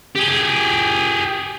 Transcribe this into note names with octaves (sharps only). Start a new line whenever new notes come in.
G4 G#4